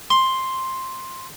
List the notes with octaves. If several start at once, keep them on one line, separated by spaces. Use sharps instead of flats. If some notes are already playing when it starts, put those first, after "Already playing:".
C6